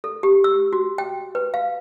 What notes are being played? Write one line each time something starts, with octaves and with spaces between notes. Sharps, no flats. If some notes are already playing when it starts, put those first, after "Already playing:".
A4
G4
E6
F#4
G5
B4
F5